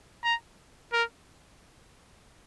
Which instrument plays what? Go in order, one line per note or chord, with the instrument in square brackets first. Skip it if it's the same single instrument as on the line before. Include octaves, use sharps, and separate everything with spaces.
[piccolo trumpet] A#5
A#4